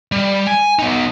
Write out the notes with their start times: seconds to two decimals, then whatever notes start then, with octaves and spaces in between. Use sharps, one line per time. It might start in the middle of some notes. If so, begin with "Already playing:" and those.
0.12 G3
0.47 G#5
0.79 B3 D#4